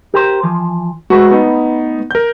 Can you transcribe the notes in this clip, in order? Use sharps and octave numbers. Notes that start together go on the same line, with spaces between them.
G4 A#4 C5
E3 F3
G#3 A3 F#4 B4
B3 D#4
A#4 G6